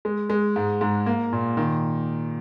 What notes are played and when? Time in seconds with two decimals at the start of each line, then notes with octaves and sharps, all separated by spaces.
0.05 G#3
0.30 G#3
0.56 G#2
0.81 G#2
1.06 A#3
1.33 A#2
1.57 D#3